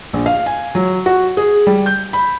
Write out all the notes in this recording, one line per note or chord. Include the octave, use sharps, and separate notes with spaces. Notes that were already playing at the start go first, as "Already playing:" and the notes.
A#1
F5
G#5
F#3
F#4
G#4
G3
G6
B5